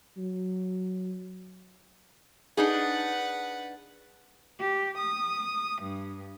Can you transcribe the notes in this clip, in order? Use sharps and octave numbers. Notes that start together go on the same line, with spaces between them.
F#3
D4 D#4 G#4 B4 F#5
G4
D#6
G2